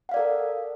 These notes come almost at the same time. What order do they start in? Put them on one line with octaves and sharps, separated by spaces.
F#5 F5 D5 A#4 A4